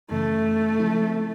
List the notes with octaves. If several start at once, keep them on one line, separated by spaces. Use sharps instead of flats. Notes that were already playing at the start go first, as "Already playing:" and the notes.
F#2 C#3 E3 A3
C#3 F3 G#3 C4 E4